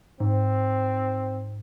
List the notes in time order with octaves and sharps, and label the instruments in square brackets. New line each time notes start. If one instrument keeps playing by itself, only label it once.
[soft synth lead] G#2 [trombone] C4